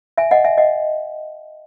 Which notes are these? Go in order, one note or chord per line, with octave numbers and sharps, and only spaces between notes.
E5 G#5
D#5 F#5
E5 G#5
D#5 F#5